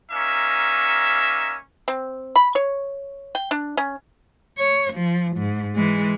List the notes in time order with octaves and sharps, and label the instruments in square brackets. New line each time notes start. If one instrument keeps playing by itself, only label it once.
[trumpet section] A#3 C#4 D#4 E5
[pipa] C4
B5
C#5
G5
D4
C#4
[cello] C#5
F3
G#2
E3 G#3